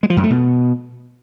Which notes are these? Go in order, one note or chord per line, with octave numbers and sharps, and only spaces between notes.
G#3
F3
F#2
A3
B2